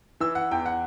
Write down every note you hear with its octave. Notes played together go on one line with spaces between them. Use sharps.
E3 E6
F#5
E2 G5
F#5